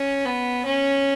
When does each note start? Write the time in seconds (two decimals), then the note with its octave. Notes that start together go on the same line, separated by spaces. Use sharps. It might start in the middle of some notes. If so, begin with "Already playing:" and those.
Already playing: C#4
0.25 B3
0.66 C#4